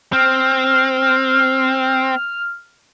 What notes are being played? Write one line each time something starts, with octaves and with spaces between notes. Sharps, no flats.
C4 F6